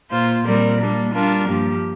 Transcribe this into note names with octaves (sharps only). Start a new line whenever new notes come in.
A#2 A#3 F4 C5
A#2 G3 C4 A#4 D5
G3 A#3 D4
G3 D4 F4 A#4
G2 F3 A#3 G4